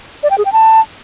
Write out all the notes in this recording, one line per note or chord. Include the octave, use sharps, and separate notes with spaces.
D5
G5
G#4
G5
A5